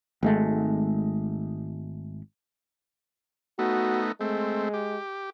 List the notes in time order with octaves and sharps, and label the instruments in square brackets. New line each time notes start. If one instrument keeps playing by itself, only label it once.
[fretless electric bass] G#1 G#3 A3
[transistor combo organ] A3 B3 D#4 [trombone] F#4
[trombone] G#3 [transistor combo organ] A3 C4
[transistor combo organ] G4